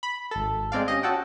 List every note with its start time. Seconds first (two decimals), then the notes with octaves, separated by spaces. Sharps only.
0.03 B5
0.31 G#1 A4
0.72 G#3 C4 D5 F5
0.88 C#4 G4 D#5
1.03 C#4 F#4 A4 F#5 G5